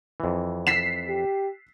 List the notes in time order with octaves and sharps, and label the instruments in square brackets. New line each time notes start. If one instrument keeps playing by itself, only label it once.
[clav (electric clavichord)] F2 E3
[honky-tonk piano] B6 C7 E7
[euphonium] G4